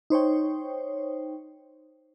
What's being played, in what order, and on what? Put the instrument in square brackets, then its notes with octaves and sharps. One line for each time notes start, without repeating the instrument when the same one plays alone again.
[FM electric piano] D#4 C5 C#5 G5